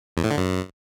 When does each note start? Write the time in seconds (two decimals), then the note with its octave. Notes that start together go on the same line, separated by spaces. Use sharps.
0.17 E2
0.24 A2
0.31 D3
0.37 F#2